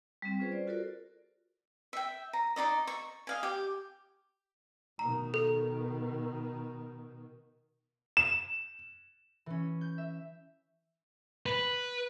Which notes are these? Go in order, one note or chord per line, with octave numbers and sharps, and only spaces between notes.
G3 C4
C#4 F4 G#4 B4 C5
D5
F4 F#4 A4 A#4 C5 D5
E5 G5
A#5
D#4 F4 D5 D#5
C#6
D#5 F5 G#5
G4
B2 D#3 A#5
A4
E7
E3 C#4
G6
E5
B4